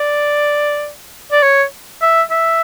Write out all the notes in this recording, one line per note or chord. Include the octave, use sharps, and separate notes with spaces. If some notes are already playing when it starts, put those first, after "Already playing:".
Already playing: D5
D5
C#5
E5
E5